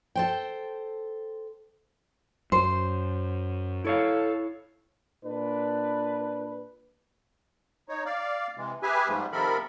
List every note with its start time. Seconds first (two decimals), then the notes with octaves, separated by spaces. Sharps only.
0.15 A4 C5 G5
2.52 F#2 C5
3.85 E4 A4 C#5 F5
5.24 A#2 D4 B4
7.89 D#4 C#5
8.06 D5 F5
8.57 C3 E3 G#3
8.83 G4 G#4 B4 E5 G#5
9.08 G#2 F3 G3 A3
9.32 C3 D#3 F3 A4 A#4 B5